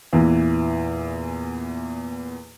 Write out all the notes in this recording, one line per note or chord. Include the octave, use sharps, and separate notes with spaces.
E2 A#2 E3